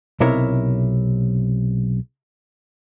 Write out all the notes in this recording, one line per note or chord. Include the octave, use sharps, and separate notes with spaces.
B1 C3 E4 A#4 C#5